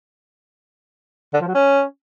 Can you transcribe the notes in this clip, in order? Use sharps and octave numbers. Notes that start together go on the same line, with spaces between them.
D3
F3
F#3
C#4